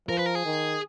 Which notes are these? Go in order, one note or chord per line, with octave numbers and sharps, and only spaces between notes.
F3 A#4
B4
A#4
G#4
D#3